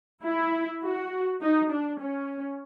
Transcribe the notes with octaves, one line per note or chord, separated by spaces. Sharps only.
E4
F#4
D#4
D4
C#4